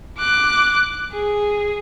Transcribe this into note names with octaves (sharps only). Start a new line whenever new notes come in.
D6 F#6
G#4